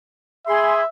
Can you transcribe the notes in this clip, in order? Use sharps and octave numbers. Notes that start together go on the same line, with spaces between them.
G#4 E5 B5 C6